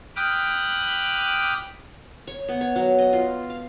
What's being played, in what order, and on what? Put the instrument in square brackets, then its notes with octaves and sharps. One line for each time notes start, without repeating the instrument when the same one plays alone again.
[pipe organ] G5 B5 D6 D#6 F6 F#6
[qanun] C#5
B3
C#5
F#3
D#5
F4
F5